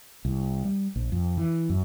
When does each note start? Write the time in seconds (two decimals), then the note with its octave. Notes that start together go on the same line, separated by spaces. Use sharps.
0.25 C2
0.65 G3
0.96 A#1
1.12 F2
1.37 E3
1.70 F#2